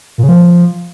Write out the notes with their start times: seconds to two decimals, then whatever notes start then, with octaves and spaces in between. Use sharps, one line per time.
0.18 A#2
0.23 C#3
0.29 F3